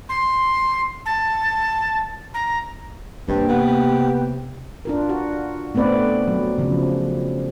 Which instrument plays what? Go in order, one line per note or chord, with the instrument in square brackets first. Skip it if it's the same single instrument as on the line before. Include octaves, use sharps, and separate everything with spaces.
[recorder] C6
A5
A#5
[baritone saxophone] G2 [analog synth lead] C3 [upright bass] A#3 [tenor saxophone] G4
[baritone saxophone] B3
[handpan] D4 F4 A#4
F#4
A3 B3 C4 B4 D5
F#3
C#3 F3